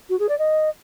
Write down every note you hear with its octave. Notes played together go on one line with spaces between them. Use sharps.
F#4
G#4
D5
D#5